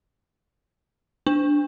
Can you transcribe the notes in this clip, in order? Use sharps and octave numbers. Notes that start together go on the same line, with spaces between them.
D4